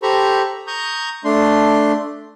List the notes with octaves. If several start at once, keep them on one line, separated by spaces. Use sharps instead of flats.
G4 A4 C5 A#5 B5 C#6
A#5 C#6 D#6 G6
A3 D4 C6